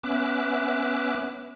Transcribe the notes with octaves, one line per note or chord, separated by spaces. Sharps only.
B3 C#4 E5 D6 F#6